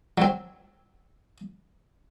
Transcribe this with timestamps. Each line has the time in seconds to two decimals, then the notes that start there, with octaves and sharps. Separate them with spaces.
0.18 F#3 C4